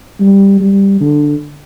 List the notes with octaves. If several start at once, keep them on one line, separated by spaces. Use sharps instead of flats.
G3
G3
D3